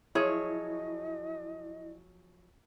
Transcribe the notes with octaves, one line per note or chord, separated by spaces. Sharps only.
F3 F#3 E4 G#4 C#5 D#5